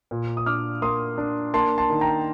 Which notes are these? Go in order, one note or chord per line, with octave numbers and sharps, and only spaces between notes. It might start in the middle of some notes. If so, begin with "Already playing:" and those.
A#2
D#6
D4 D6 F6
A#3 C6 D#6
D4
A#3 A5 C6
A5 C6
D#3
G5 A#5